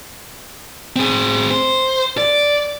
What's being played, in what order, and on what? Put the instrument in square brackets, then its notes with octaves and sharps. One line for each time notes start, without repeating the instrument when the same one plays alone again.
[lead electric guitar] C4 G#4
C5
D5